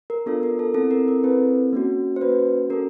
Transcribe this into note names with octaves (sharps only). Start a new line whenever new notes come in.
A#4
B3 D4 F4 A4
A#4
A4
C4 E4 A4
A#4
A#4
C4 E4 A4 B4
A#3 C#4 F#4
C5
A#3 C#4 F#4 B4
C#4 F#4 A4 A#4